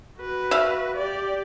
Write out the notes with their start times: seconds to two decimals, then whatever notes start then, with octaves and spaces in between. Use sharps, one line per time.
0.18 F#4 B4
0.51 E5 F5
0.97 G4 D5